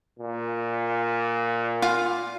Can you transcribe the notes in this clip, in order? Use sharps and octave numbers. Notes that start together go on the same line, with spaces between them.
A#2
F4